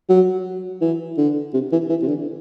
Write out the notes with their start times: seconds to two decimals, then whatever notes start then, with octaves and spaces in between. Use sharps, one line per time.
0.09 F#3
0.81 E3
1.18 D3
1.54 C3
1.72 E3
1.90 E3
2.02 C3
2.08 D3